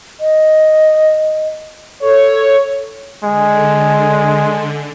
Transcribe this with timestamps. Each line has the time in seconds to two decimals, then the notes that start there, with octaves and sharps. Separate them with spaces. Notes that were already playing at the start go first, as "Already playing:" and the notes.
0.20 D#5
2.02 A4 C#5
3.24 D3 G#3